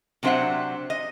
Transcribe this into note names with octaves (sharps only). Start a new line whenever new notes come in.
C3 F#3 D4 C5 E5 F#5
D#5